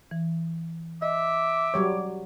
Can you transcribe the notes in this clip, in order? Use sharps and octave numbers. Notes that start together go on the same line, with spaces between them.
E3
D#5 E5 D6
F#3 G3 C#5